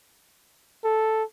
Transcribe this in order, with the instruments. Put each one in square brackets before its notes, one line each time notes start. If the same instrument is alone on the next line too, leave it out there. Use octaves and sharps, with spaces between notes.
[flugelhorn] A4